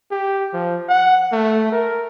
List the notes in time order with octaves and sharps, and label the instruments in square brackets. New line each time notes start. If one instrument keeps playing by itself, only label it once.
[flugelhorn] G4
F3
F#5
A3
A#4